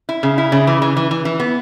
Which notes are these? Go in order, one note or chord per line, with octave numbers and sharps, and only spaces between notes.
E4
C#3
E4
C#3
E3
E3
E3
E3
E3
B3